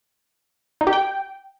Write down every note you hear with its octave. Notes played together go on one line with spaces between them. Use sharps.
D#4
G4
G5